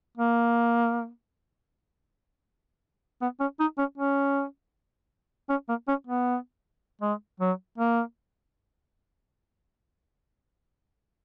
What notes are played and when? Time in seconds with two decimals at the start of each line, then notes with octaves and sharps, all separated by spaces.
0.17 A#3
3.22 B3
3.40 C#4
3.60 D#4
3.78 C#4
3.98 C#4
5.49 C#4
5.69 A#3
5.88 C#4
6.07 B3
7.01 G#3
7.40 F#3
7.78 A#3